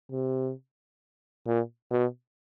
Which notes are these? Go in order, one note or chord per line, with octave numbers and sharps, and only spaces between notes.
C3
A#2
B2